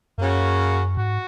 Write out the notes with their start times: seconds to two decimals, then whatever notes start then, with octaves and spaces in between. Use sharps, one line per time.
0.18 F#2 C#3 A#3 C#4 F#4
0.97 G#2 F#4